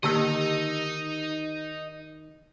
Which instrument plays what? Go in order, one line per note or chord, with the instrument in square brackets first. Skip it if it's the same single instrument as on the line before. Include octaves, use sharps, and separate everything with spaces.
[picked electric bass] D3 A#3 [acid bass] D#3 [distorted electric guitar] D#4 D#5 [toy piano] G4 A5 E6